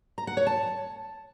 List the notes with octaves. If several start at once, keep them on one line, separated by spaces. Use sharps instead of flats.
A#5
F#5
C#5
A5